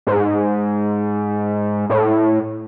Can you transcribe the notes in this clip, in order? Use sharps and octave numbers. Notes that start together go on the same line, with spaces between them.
G#2
A2